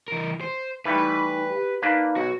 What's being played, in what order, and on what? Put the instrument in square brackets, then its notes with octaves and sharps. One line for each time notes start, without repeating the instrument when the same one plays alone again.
[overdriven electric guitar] E3 A#4
C5
[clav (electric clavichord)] E3 G3 A3 [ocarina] D#4 [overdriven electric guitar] B4 B5
[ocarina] G4
[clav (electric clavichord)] A#3 D4 B4 [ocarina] D#4
[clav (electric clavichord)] B1 [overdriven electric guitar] F#4